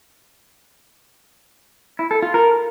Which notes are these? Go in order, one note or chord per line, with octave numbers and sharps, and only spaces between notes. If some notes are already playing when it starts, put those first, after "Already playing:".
E4
A4
F4
A#4